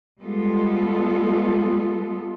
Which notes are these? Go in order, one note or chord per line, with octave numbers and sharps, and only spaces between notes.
G3 G#3 B3 F4 A4